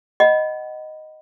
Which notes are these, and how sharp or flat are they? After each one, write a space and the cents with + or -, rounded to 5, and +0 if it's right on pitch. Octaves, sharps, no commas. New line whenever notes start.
D#5 +0 F#5 +20 B5 +0